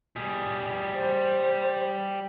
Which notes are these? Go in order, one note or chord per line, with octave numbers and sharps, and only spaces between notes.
G3 G#4
C5